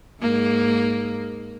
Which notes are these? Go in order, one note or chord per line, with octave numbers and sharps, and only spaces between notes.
G#2 A#3